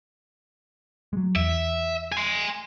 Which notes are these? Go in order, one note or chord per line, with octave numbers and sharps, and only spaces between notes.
F#3 G#3
E2 E5
G#5 C6